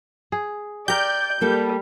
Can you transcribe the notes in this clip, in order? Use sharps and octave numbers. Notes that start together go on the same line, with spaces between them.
G#4
G4 A#4 D5 G6
G3 A#3 A4